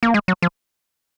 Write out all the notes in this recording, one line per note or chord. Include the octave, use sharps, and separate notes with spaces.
A#3
G#3
F#3
F3